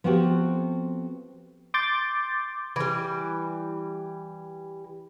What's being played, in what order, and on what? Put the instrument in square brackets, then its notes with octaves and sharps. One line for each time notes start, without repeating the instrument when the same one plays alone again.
[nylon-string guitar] F3 B3 C4 F#4 G4 A4
[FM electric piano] C6 D6 G6 A6
[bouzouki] E3 G3